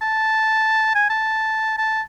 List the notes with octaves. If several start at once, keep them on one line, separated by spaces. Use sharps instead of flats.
A5
G#5
A5
A5